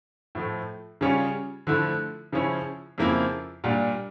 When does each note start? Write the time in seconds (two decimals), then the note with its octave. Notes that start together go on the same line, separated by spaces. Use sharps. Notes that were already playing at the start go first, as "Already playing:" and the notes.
0.35 A2 F3 A3
1.01 C#3 G3 C#4 F4
1.67 D3 F3 A3 E4
2.33 C#3 F3 C#4 E4
2.98 F2 C#3 F3 A#3 E4
3.64 A#2 G3 D4 F4